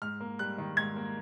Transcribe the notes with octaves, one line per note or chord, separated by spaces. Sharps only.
G#2 F6
A#3
G3 F#6
D#3
G#2 G#6
A#3